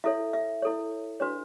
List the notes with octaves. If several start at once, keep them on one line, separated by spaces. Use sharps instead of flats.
E4 A4 C#5 E5
E5
E4 A4 C#5
D4 F#4 B4 C#5